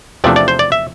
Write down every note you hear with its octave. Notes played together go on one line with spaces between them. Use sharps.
E2 C3 F3 A3 D4 D5
D5
C5
D5
E5